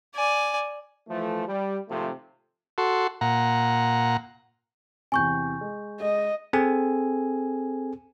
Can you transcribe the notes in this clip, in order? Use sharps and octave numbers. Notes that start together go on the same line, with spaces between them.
D5 G#5
E3 F3 A3
G3
G#1 C3 F3 A3
F#4 A4 C6
A#2 F#5 A#5
E2 C3 G#5 C#6 G6
G#3
G#3 D#5
C4 G#4 A4 G#5